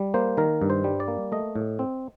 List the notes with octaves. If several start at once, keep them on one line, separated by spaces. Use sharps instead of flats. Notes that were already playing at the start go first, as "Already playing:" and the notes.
Already playing: G3
A#3 C5
D#3 A#4
G2
C5
G3
D5
A#3
A3 D#5
A2
C4